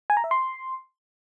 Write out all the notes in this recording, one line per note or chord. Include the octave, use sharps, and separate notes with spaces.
G#5
A#5
E5
C6